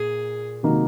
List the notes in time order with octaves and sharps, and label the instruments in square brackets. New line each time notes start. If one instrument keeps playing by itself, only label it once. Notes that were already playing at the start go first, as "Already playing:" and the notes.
Already playing: [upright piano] A#2 [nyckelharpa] G#4
[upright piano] C3 D#3 F#3 A#3 D#4